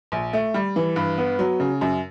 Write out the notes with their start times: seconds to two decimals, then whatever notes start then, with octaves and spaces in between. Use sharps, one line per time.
0.12 A#1
0.33 A3
0.54 G3
0.76 E3
0.96 G2
1.18 B3
1.39 F#3
1.60 C#3
1.81 F#2